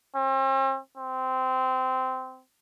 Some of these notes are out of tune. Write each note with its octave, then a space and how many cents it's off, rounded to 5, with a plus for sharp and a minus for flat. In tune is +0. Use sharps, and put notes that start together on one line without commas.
C4 +45
C4 -15